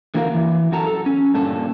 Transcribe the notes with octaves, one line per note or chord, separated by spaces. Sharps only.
D3 E3 A#3 F#4 A#4 F5
E3
F#2 F#4 A4 A#5
A4
C#4
G2 A#2 A4